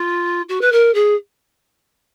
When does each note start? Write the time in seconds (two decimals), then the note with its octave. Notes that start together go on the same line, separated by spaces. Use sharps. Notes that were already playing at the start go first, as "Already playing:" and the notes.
Already playing: F4
0.49 F#4
0.61 B4
0.72 A#4
0.94 G#4